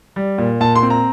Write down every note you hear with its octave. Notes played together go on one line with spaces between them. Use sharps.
G3
A#2
A#2 A5
C6
C4
A#5